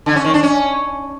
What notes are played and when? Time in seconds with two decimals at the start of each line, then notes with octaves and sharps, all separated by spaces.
0.06 D3
0.15 C#4
0.25 D#3
0.34 D4
0.43 C#4